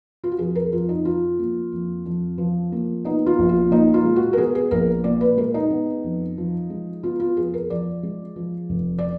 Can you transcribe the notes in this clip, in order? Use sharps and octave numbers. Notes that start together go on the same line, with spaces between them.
F4
F#4
F2 G#4
A#4
F2 F4
D#4
F3 F4
A#3
F2
F2
F3
A#3
B3 D#4
F4
A#1
F4
A#2 D#4
F4
G#3
F#4
A#4
B3 G#4
G#4
A#1 A#4
A#2 D5
B4
G#3 A#4
D#4
B3
F2
F3
G#3
B3 F4
F4
F2 G#4
A#4
F3 D5
G#3
F3
F1
D5